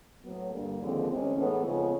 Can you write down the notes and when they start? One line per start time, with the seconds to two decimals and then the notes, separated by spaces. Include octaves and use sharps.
0.23 A2 F#3 B3
0.51 G2 D3 G3 A#3
0.79 D#2 D3 F3 G#3 C4
1.08 D2 C3 E3 G#3 C#4
1.36 A2 E3 G#3 B3 D#4
1.64 F2 C#3 F3 G#3 B3